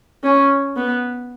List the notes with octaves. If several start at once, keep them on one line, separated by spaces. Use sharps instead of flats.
C#4
B3